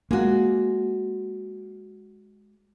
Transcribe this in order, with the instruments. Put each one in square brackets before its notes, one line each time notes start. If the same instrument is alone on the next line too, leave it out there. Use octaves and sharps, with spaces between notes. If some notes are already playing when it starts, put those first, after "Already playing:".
[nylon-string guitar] G#3 F#4 [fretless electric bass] A#3